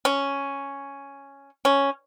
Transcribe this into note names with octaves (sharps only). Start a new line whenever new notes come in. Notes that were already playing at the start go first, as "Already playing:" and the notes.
C#4
C#4